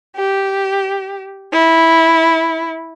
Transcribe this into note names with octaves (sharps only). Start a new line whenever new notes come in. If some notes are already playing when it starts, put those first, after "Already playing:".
G4
E4